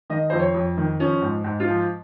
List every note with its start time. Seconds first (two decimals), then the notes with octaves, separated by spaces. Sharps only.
0.10 D#3 D#5
0.30 F2 C5
0.39 C#5
0.54 F2
0.77 D#3
0.99 F3 C#4
1.22 G#2
1.44 G#2
1.60 F4
1.68 F3